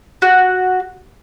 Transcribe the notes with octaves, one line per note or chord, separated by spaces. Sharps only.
F#4